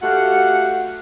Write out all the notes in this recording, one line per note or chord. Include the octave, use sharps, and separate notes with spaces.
A3 F#4 G4 F5 F#5